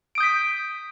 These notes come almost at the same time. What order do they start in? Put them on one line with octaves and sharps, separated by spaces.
D7 D#6 G6 B6